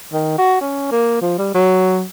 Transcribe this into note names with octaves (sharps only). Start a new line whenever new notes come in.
D#3
F#4
C#4
A#3
F3
G3
F#3